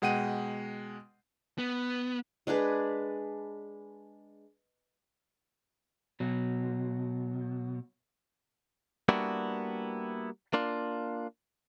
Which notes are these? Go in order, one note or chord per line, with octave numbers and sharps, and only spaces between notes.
B2 G#3 F#5 G5 D#7
B3
G#3 D4 G#4 B4
B2 F#3
G3 A#3 B3 D4 E4 F#4
A#3 D4 F4